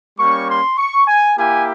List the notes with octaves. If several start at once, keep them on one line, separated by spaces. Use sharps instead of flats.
G3 A#3 C#4 C#6
C6
C#6
G#5
A#3 E4 G4 G#5